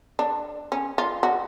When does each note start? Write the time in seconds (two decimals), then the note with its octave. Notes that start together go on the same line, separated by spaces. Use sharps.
0.19 D4
0.72 C#4
0.98 F4
1.23 F#4